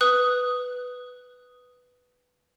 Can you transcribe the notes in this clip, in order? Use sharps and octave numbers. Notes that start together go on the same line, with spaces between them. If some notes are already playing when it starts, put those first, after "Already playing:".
B4 D#6 F#6